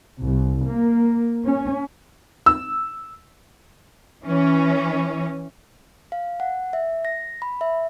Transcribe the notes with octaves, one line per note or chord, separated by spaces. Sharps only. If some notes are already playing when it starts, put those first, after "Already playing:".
C2
A#3
C#4
E6
E3 C#4
F5
F#5
E5
A#6
B5
E5